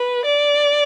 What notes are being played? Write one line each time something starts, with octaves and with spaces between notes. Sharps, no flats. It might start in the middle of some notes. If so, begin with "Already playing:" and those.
Already playing: B4
D5